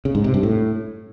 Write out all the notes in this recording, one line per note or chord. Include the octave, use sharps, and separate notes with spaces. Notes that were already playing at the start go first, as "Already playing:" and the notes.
C#3
G#2
C3
G2
A2